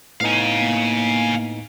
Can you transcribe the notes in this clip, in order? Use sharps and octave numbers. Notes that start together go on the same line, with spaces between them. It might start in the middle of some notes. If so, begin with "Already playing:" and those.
A2 B3 D#4 F5 G#5
A#3